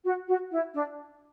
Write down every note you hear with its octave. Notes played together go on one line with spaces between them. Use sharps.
F#4
F#4
E4
D4